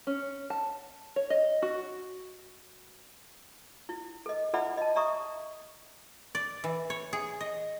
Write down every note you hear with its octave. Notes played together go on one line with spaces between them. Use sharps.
C#4
A5
C#5
D#5
F#4
E4
A4 D#5
E4 A4 D5 E5 F#5 B5
D#5 A5
D5 E5 A#5 C#6 D#6
D5
E3
C#5
G#4
D#5